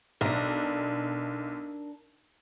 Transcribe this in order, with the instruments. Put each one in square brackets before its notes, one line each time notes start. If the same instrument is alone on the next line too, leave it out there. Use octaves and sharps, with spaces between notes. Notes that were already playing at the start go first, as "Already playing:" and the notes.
[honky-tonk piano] B1 [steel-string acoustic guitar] D4 A#4